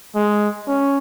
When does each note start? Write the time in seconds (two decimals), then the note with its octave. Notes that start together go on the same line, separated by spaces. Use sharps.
0.15 G#3
0.67 C#4